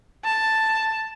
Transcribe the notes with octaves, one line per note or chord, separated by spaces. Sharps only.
A5